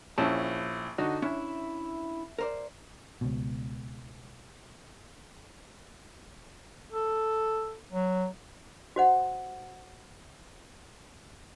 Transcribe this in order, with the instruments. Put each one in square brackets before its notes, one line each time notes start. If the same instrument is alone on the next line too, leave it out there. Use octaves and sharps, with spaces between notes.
[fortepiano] A#1 C#4 E4 [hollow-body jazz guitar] A5
[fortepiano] D3 D#4 F#4
[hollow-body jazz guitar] C#4 D4 E4 [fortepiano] E5
[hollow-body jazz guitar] A#4 C5 D5
[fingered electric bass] C#2 B2
[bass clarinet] A4
F#3
[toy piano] F#4 C5 F#5